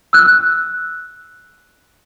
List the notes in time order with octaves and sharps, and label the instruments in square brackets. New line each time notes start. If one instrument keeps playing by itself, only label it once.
[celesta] E6 F#6